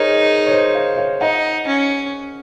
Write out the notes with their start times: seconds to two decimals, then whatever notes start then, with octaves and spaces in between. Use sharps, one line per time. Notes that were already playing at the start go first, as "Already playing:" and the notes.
Already playing: D#4 G#4 A#4 C5 C#5
0.47 C#5
0.51 C5 D#5
0.75 C#5 F5
0.97 C#5 F5
1.21 D#4 D#5 F#5
1.67 C#4